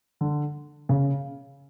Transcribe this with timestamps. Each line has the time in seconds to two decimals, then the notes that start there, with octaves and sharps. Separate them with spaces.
0.21 D3
0.89 C#3